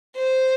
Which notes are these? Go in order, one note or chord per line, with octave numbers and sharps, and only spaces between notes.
C5